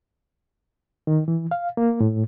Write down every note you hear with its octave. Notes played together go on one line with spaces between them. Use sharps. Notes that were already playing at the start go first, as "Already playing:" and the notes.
D#3
E3
F5
A#3
A2